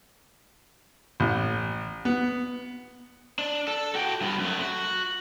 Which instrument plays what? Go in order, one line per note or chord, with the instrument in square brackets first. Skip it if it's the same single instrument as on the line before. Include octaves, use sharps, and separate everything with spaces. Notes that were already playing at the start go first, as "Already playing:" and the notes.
[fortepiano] A1
B3
[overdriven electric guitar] D4
A4
F#4 G5
G2 B3
F#2 A3
F#4